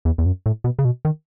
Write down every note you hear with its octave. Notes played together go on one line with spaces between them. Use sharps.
E2
E2
F#2
A2
B2
C#3
B2
D#3